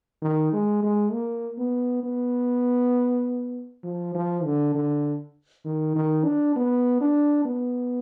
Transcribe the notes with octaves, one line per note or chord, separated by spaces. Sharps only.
D#3
G#3
G#3
A#3
B3
B3
F3
F3
D3
D3
D#3
D#3
D4
B3
D4
B3